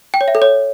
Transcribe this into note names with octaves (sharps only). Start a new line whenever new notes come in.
G5
C#5
E5
A4
C#5